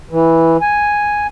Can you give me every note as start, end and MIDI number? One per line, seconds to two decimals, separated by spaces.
0.11 0.57 52
0.62 1.27 80